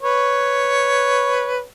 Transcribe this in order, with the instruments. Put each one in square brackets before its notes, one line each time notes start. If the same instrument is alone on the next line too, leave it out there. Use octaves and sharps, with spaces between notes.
[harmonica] B4 C#5